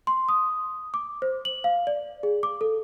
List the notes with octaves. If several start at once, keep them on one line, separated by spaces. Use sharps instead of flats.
C6
D#6
D6
C5
F#7
F5
D5
G#4
D6
A4